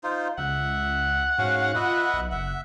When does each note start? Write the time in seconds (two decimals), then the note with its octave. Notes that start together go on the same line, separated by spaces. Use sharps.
0.04 D#4 F4 C5
0.38 C#2 E5 F#5
1.38 G#2 C#4 F#4 F5
1.75 F4 B4 D#5 E5
2.14 B1
2.32 F#1 E5